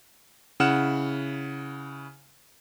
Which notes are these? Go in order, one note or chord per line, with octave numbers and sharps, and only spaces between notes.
C#3 E4 F#5 F6 E7